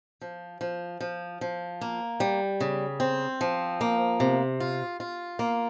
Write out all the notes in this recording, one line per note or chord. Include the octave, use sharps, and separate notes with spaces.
F3
F3
F3
F3
A#3
G3
C#3
C4
F3
A#3
C3
F4
F4
A#3